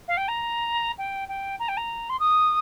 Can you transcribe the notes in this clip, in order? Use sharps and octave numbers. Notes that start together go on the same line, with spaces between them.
F5
G5
A#5
G5
G5
A#5
G5
A#5
C6
D#6